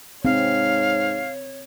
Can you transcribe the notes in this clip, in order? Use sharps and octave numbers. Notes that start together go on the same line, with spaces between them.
G#2 C4 C#5 F5